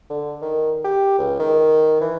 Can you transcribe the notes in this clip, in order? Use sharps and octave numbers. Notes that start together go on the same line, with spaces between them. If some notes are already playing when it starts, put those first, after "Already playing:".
D3
D#3
G4
C#2
D#3
E3